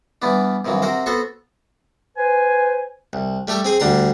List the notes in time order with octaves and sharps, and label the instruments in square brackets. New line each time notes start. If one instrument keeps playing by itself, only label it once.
[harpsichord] E3 G3 B3 D4
G2 C3 D#3 E3 F#3
C3 C4 F#4 A#4 C5
B3 F#4 A4 C5 C#6
[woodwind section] B4 C5 G#5
[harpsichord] C2
G3 A3 G4 A4
C4 G#4 G#5
D2 D3 G3 A#5 C6